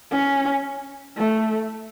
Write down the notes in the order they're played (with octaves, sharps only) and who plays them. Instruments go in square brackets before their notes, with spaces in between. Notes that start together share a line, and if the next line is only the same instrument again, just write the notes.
[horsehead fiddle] C#4
A3